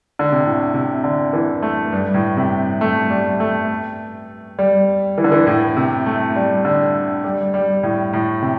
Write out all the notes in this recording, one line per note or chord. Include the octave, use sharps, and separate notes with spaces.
D3
C3
A2
C3
D3
E3
A3
G2
A2
C3
A3
G3
A3
G3
E3
D3
E3
A2
C3
A3
G3
D3
G3
G3
A2
A2
C3